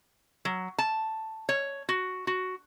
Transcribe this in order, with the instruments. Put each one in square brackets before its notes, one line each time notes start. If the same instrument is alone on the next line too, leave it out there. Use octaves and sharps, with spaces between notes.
[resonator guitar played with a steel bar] F#3
A5
C#5
F#4
F#4